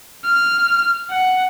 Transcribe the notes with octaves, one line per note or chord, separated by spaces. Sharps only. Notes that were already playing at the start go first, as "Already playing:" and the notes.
F6
F#5